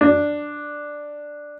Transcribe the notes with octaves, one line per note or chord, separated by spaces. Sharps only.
D4